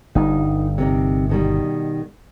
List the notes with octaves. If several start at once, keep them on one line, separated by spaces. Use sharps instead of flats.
G1 G2 D#4
C3 A#3 D#4
B2 D#3 G3